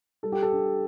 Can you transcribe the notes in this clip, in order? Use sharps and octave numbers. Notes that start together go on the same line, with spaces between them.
G3 A4
G4
A4
D4